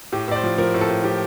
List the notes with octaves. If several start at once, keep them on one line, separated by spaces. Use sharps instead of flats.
A2 G4
A2 D5
C5
F3
F3 A#4
A2
A4
A2
F3 G4